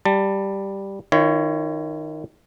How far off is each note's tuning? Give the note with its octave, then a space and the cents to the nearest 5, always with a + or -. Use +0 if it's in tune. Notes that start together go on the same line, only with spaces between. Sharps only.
G3 +0 A5 +25
D#3 +0 F4 -45 C#5 +5